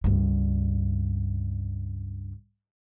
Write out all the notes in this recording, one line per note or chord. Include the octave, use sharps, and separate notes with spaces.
C#2 G2